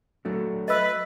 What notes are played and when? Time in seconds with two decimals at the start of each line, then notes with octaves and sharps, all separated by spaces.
0.25 F#3 A3 D4
0.68 B4 D#5 E5 E6